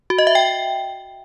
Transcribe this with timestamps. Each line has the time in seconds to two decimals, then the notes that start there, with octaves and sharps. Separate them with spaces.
0.10 F#4
0.18 D#5
0.27 E5
0.35 G5